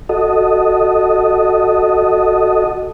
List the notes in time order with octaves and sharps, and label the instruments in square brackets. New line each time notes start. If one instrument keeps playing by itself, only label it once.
[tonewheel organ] F#4 A4 D#5